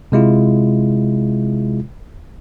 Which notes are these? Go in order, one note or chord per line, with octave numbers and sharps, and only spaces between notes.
C3 G#3 E4 F4